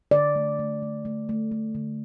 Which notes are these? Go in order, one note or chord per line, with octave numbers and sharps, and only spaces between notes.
D3 D5
A3
A3
A3
A3
A3
A3
D3